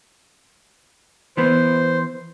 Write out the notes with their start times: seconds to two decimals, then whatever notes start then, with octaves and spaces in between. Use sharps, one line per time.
1.37 E3 B3 C5